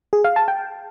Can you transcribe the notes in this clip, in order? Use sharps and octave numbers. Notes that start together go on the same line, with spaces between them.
G#4
F5
A5
G5